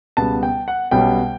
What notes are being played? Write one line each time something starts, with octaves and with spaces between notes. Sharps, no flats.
C#2 B2 G3 B3 A5
G5
F#5
B1 B2 G3 C#4 G5